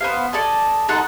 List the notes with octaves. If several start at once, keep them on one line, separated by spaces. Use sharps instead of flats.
B3 C5 F5
A4 D5 D#5 G#5
D#4 A4 F#5 C6